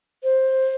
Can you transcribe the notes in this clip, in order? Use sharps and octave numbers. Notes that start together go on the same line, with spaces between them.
C5